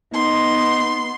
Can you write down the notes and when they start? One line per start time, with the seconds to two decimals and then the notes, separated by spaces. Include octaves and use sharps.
0.13 B3 D#4 C6